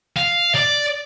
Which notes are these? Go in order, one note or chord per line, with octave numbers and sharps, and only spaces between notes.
F5
D5